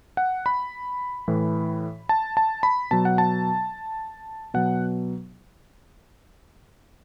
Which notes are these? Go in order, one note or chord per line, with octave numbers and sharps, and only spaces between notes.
F#5
B5
A2 E3
A5
A5
B5
B2 F#3 A5
F#5
A5
B2 F#3 F#5